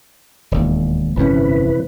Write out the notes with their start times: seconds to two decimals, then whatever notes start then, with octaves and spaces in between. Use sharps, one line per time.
0.51 E1 D#2
1.16 G1 F2 C3 E3 C#4 B4